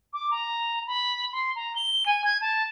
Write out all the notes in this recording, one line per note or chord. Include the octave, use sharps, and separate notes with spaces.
D6
A#5
B5
C6
A#5
G7
G#5
G#6
A5